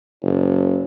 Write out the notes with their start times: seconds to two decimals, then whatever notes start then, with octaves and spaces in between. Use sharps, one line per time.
0.23 F#1